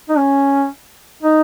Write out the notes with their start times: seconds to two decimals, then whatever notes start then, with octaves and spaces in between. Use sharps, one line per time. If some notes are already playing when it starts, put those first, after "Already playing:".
0.09 D#4
0.18 C#4
1.23 D#4